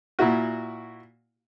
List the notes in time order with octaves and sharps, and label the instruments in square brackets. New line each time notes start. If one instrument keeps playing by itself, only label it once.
[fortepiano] A#2 E4 F#4